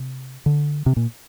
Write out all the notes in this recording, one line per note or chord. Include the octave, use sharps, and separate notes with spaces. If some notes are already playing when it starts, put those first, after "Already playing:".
Already playing: C3
D3
C3
A#2